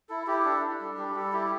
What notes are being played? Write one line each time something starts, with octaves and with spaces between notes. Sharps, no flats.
E4 A4
E4 G4
D4 A4
D4
G3
G3 G4
G3 A4
E4 G4